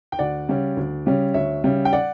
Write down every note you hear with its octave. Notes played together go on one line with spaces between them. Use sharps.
G5
D2 D5 F#5
C#3 G3 C#4
D2
C#3 G3 C#4
D2 C#5 E5
C#3 G3 C#4
G5
D5 F#5